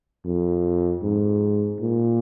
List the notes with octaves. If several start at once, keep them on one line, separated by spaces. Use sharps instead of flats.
F2
G#2
A#2